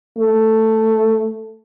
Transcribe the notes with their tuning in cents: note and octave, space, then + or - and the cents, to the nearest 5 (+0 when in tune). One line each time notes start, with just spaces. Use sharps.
A3 +5